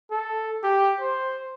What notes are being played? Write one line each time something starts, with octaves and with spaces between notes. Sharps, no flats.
A4
G4
C5